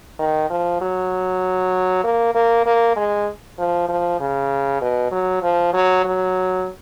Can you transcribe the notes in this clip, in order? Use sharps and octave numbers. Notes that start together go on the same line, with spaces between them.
D#3
F3
F#3
A#3
A#3
A#3
G#3
F3
F3
C#3
B2
F#3
F3
F#3
F#3